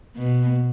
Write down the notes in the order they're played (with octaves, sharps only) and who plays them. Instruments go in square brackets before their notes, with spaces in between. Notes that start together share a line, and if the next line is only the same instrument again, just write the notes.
[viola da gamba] B2